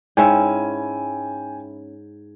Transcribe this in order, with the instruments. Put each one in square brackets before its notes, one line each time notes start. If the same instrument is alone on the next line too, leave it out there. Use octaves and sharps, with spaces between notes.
[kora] G#2 C#4 E4 [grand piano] G5 G#5